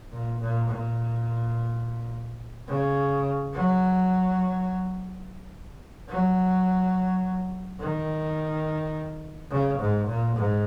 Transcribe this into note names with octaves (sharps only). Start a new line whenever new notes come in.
A#2
A#2
A#2
C#3
F#3
F#3
D#3
C#3
G#2
A#2
G#2